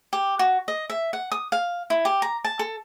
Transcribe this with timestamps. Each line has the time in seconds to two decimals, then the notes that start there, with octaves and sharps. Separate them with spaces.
0.13 G4
0.39 F#4
0.68 D#5
0.90 E5
1.13 F#5
1.32 D#6
1.52 F5
1.90 E4
2.05 G4
2.22 A#5
2.45 A5
2.59 A4